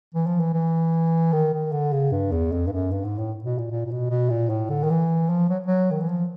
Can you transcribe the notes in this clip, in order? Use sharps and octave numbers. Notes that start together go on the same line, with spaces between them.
E3
F3
E3
E3
D#3
D#3
D3
C#3
G2
E2
F2
G2
F#2
G2
G#2
A2
B2
A#2
A#2
A#2
B2
B2
A#2
A2
D3
D#3
E3
F3
F#3
F#3
D#3
E3
F3